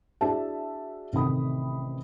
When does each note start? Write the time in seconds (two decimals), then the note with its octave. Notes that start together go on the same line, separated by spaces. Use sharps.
0.21 D4 E4 F#4 G#4 E5 A5
1.13 A1 C3 D#3 A3 B5 D#6